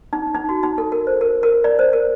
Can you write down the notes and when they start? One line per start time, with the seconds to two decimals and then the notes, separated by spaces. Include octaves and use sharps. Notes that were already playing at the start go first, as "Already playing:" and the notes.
0.13 D#4
0.34 D#4
0.49 F#4
0.63 D#4
0.78 A4
0.92 A#4
1.07 C5
1.21 A#4
1.43 A#4
1.64 D5
1.79 C5
1.93 A#4